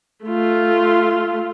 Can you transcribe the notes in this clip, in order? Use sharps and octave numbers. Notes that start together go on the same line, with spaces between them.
A3 F4